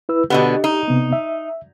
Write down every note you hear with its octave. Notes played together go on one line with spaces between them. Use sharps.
E4 B4 E6
B2 D3 B3 G4 D#5
D#4
C3 B3
E5